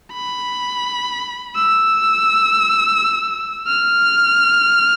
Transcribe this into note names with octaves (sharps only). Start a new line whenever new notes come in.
B5
E6
F6